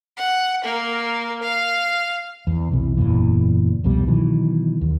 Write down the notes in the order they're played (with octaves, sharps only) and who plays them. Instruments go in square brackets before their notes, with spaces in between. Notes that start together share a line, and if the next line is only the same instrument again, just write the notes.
[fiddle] F#5
A#3 A#4
F5
[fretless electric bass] E2
B1 E2 C3 E3
F#1 E2 A#2 E3
C2 F2 B2 G3
B2 D#3 E3 F#3
D#2